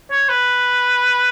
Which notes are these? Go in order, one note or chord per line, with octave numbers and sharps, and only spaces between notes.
C#5
B4